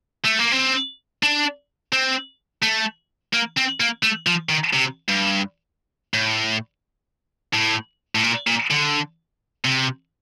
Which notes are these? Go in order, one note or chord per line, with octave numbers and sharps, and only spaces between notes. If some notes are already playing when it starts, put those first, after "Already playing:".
A3
A#3
C4
D4
C4
A3
A#3
C4
A#3
A3
F3
D#3
C3
G2
A2
A2
A2
A#2
A#2
D3
C3